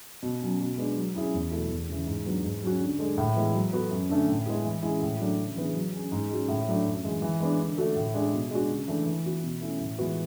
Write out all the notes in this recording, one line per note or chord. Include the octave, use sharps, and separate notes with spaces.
B2
F#3 C#4
B2
G#3 B3 D4
F#3
C#4 E4 G#4
E2
B2 A3 E4
E2
C#3 E3
G#2
F#3 B3 D4 F#4
G#2
F#3 C#4 F#4
D3
G#3 D4 A4
A2
E3 G#3 B3 E4
F#3
B3 F#4 A4
F#2
D3 A3 C#4
A2
G#3 B3 E4 G#4
E3
G#3 C#4 E4 G#4
A2
F#3 A3 D4
C#3
E3 B3 D4 G#4
F#3
C#4 G#4
G#2
G#3 C#4 F#4
A2
F#3 A3 D4
F#2
E3 G#3
E3
G#3 B3 D4
D3
A3 D4 F#4 A4
A2
G#3 D4 G#4
B2
G#3 D4 F#4
C#3
E3 A3 D4
E3
B3 F#4
B2
A3 C#4 E4
A2
E3 G#3 B3 F#4